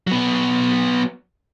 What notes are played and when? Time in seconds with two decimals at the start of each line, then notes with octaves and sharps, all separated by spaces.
0.07 F#3 B3